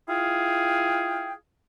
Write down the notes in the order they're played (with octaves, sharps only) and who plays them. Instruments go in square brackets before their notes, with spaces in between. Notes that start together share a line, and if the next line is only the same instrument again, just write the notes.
[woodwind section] E4 F4 G#4 F5 G5